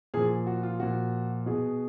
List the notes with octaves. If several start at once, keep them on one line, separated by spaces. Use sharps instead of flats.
A#2 F3 G#4
F#4
F4
A#2 F3 F#4
B2 G#4